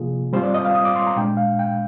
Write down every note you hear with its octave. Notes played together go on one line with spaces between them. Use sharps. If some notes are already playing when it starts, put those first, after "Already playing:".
Already playing: C3 F3 A#3 F4 G#4
G3 C4 F4 C5
D5
D#5
F5
D#6
D6
C6
A#5
A#2 G#3 D4 G5
F5
G5